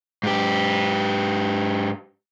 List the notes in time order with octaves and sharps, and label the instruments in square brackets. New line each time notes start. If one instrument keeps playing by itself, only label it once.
[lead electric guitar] G#2 G4